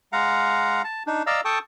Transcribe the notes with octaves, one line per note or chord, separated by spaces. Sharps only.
G#3 F5 F#5 A#5
A5
D4 D#4
D5 D#5 F5 A#5 E6
A4 G5 A5 C#6 D#6